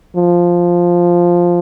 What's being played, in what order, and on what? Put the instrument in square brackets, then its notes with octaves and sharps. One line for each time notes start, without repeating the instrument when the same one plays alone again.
[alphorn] F3